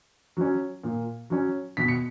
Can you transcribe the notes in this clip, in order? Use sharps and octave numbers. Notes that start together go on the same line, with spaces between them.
F#3 C#4
A#2
F#3 C#4
B2 B6
C#7